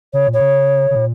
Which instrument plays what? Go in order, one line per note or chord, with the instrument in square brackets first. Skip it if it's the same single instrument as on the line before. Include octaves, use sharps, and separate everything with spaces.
[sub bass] C#3 [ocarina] C#5
[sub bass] A#2
[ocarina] C#5
[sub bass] C#3
C#3
A#2